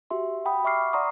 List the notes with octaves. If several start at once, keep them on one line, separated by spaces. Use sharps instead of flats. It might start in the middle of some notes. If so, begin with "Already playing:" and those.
F#4 G4 E5 C6
F#5 G5 B5 D#6
E5 C#6 D6 F6 C7
D5 F#5 A#5 C6 C#6 D#6